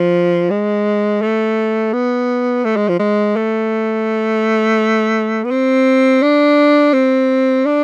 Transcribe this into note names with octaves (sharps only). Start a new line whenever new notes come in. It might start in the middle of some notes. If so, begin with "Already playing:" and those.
Already playing: F3
G#3
A3
B3
A3
G#3
F3
G#3
A3
B3
C4
D4
C4
D4